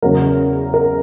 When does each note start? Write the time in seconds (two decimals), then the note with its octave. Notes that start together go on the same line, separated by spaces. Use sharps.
0.02 E2 C#3 F#3 A#4
0.74 A#4